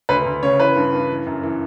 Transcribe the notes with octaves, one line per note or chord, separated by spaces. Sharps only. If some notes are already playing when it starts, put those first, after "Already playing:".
D2 B4
D2
C#3 C#5
E3 B4
G2
G2
E3
F#2
E3